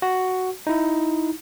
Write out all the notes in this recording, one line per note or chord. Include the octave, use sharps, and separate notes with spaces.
F#4
D#4 E4